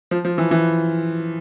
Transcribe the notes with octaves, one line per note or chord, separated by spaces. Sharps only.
F3
F3
E3
E3